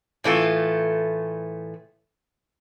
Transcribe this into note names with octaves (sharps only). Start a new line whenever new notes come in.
A2 E3 A3 F4